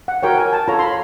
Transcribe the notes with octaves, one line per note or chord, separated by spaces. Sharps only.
F#5
F#4 A#4 C#5 G5
G#5
A5
F4 A4 C#5 A#5
C6
B5